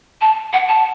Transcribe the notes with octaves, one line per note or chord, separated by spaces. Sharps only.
A5
F#5
A5